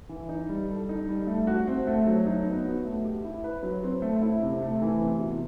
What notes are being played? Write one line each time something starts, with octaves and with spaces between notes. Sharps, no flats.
E3
D#4
G3
A4
D#4
G3
A3
F#4
C4
A3
F#3
D#4
B3
F#4
A3
G4
E4
B4
F#3
C4
A3
E4
C3
A3
E3
C3
B2